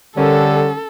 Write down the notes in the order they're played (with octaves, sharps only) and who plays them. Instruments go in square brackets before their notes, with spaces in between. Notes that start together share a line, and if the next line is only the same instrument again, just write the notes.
[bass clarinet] D3 [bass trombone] G3 [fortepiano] C#4 A#4 [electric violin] A4